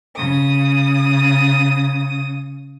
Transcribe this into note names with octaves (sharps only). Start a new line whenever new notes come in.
C#3 D#6